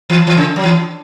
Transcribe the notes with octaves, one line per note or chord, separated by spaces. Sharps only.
E3
E3
C#3
F#3
E3